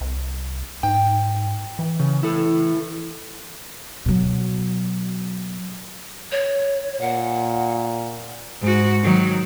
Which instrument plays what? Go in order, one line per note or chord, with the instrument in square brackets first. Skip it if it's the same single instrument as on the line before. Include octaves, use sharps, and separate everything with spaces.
[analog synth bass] C2
[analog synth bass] G#2 [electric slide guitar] G5
[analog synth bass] E3
[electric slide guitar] C#3
E4 A4
[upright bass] B2 F#3
[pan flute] C#5
[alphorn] A#2 [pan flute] F#5
[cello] G#2 F#4
D#3 F#3